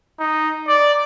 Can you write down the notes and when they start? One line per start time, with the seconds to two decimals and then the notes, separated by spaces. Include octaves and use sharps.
0.19 D#4
0.68 D5